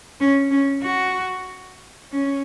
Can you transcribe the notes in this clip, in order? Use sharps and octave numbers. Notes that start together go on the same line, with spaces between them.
C#4
C#4
F#4
C#4